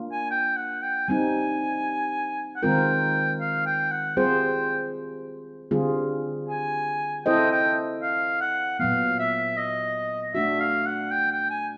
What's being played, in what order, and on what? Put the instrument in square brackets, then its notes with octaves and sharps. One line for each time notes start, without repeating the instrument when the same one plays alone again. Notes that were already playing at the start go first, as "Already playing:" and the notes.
Already playing: [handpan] A#3 D4 F4
[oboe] G#5
G5
F#5
G5
[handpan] G3 C4 D#4 [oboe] G#5
[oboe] F#5
[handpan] D#3 G#3 C4 F4 A#4 [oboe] G5
[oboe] F5
G5
F#5
[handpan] G3 C4 F4 G#4 C5 [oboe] G5
[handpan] D3 G3 C4 F4 G#4
[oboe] G#5
[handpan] C4 E4 A4 C5 D#5 [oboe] G5
[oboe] G5
F5
F#5
[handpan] A#2 F#3 B3 [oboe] F5
[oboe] E5
D#5
[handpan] A3 D4 F#4 [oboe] E5
[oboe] F5
F#5
G5
G5
G#5